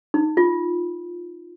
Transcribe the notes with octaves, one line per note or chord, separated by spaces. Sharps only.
D#4
F4